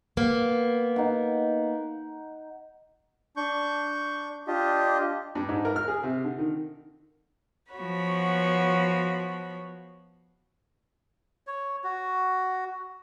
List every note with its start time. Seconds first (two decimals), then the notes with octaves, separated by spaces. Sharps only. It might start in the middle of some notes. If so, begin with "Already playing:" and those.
0.17 A#3 B3
0.96 D#4 F#5
3.36 D4 C#6 G6
4.47 D4 F4 G4 D#5
5.35 G2
5.49 G#2
5.65 A#4
5.76 F6
5.88 G#4
6.03 C3
6.24 D3
6.38 D#3
7.73 F3 B3 F#4 C#5 B5
11.47 C#5
11.84 F#4